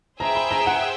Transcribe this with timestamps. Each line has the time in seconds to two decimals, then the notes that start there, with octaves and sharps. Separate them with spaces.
0.20 G#4 C5 E5 G5 A#5
0.35 B5
0.51 A#5
0.67 F#5